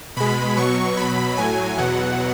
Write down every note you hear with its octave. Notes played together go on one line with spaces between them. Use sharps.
B2 G#3 B5
B2 F#3 C#6
B2 F#3 B5
A2 F#3 G#5
E2 B2 F#3 F#5